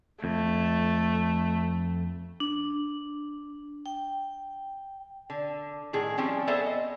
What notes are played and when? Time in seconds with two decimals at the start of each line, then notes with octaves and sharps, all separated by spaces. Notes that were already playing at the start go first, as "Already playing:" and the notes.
0.24 F2 A3
2.40 D4
3.86 G5
5.30 D3
5.93 A2 D#3 G#4
6.18 F3 G3 C4 C#4 G5
6.47 B3 G#4 A4 C5 D5 E5
6.66 D#5